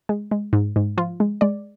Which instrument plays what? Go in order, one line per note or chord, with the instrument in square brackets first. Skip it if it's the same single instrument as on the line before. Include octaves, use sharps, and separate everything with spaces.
[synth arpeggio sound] G#3
G#3
G#2
G#2
F3 F4
G#3
G#3 D5